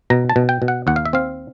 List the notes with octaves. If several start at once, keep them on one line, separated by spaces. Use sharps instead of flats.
B2 A#5
A5
B2
G5
B2
F#5
D#2 F#5
F5
E5
C4 F5